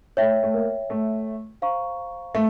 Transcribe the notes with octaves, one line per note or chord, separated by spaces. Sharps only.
A3 C#5 E5 G5
A3
A#3
A3
C5 F5 A#5 C#6
A3